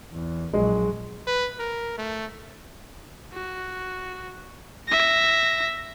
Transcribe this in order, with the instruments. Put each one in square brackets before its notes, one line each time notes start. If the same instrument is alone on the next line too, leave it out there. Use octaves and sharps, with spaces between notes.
[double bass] E2
[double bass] A#1 F#3 [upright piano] G#3
[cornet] B4
A#4
A3
[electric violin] F#4
E5 A#6